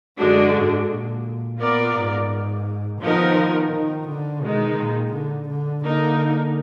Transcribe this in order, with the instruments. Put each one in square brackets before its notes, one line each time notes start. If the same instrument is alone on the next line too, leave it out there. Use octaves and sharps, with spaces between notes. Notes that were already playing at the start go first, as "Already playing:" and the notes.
[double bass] F#2 [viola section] D3 G#3 D4 F#4
[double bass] G#2
A#2
[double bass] A#2 [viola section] B3 F4 A#4 D5
[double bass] G#2
[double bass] D#3 [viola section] F3 B3 D#4 A#4
[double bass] D#3
D3
[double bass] B2 [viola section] D#3 G#3 D#4
[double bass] A#2
D3
D3
[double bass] D3 [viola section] A#3 D#4 A#4